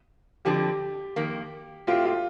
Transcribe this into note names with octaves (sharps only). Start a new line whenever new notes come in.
F2 D3 F3 C4 G4
F2 D#3 A#3
A2 A3 C4 F4 G4
F4